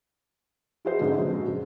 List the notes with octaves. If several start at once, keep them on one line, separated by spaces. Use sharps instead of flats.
E4 F#4 G#4 B4 C5 E5
G#2 D3 C#4 D#4
A#1 F#3
F#2
C#3